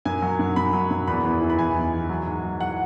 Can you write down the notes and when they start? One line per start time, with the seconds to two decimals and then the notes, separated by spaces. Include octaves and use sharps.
0.05 F#2 G#5
0.22 F#3
0.39 F#2
0.56 F#2 B5
0.73 F#3
0.91 F#2
1.07 E2 B5
1.25 E2
1.42 E3
1.50 B5
1.58 E2 G#5
1.75 E3
1.93 E3
2.09 F#3
2.26 G#2
2.44 F#3
2.61 F#3 F#5